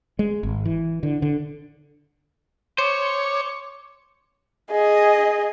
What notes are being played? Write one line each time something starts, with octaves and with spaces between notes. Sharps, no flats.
G#3
G#1
E3
D3
D3
C5 C#5 D6
G#4 D#5